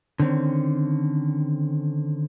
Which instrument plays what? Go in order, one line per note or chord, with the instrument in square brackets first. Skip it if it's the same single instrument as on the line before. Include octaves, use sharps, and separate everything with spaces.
[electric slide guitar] D3 D#3 C4 C#4